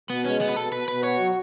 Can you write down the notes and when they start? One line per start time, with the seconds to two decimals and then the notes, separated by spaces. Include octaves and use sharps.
0.10 B2 B3
0.25 G#3 C#4
0.40 B2 B3
0.49 B4
0.56 B2 A4
0.72 B2 B4
0.88 B2 B4
1.04 F#4 C#5
1.19 F#3